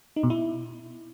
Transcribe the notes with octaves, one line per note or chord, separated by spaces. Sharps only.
D#4
B2
E4